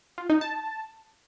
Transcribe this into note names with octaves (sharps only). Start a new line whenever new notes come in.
F4
D#4
A5